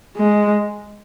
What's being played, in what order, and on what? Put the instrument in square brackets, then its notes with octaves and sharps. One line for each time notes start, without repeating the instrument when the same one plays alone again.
[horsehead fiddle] G#3